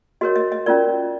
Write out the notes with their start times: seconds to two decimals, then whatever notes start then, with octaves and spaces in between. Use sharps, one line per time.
0.21 F#4 A#4 C#5 D#5
0.36 D#5
0.52 D#5
0.66 C#4 F4 A#4 D5